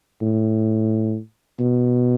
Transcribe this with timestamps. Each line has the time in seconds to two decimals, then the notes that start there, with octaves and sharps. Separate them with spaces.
0.22 A2
1.59 B2